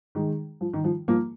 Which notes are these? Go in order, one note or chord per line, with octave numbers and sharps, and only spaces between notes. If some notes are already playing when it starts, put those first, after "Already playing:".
D#3 G#3
F3
D#3
F3
F3 A#3